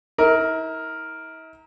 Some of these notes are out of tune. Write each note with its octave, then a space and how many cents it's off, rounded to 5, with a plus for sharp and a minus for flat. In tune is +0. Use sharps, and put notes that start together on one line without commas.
E4 -45 A#4 +0